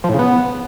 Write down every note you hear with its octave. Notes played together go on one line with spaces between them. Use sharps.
F3
A2
C#3
B3